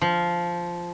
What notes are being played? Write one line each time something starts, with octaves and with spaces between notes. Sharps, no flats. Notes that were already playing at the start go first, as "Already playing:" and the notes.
F3